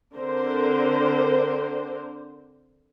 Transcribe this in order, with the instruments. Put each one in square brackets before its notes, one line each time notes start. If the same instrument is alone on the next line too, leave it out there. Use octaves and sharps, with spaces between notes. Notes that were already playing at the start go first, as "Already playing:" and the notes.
[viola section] D3 C4 D4 A#4 C5